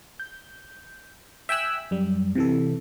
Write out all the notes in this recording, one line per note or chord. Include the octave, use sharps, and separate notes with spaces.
G6
E5 G5 G#5 E6 F#6
F#2 G3
C3 E3 A4